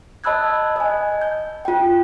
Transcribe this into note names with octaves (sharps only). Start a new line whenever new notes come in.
D#5 A5 B5 E6 F#6 G#6
D#5 G#5
G6
F4 G5